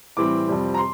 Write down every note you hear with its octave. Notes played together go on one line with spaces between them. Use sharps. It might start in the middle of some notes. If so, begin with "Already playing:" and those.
A2 E3 G3 C4 D6
F2 C3 G3 C4
A#5
C6